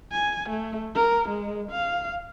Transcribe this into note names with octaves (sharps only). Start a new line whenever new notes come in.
G#5
A3
A#4
G#3
F5